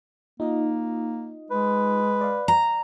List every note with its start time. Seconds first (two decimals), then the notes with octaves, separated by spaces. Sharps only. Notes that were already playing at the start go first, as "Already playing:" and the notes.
0.40 A#3 D#4 F4 D#5
1.51 G#3 B4
2.21 D5 F5
2.48 A#5